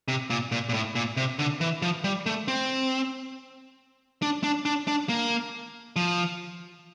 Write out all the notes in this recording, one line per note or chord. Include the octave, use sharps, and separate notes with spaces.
C3
A#2
A#2
A#2
A2
A#2
C3
D3
E3
F3
G3
A3
C4
D4
D4
D4
D4
A#3
F3